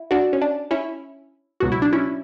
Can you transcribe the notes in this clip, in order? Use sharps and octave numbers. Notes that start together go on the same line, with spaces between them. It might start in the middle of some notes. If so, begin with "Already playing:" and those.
Already playing: E4
D4 F#4
C#4
D4
C#4 E4
C#2 B2 F#3 F#4
E4
D4
C#4 E4